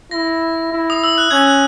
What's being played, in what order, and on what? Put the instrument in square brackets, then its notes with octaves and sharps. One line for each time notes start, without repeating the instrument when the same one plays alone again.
[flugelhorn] E4 [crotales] A#6
[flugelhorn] E4
[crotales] D#6
E6
F#6
[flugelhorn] C#4 [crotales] G#6
[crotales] F#6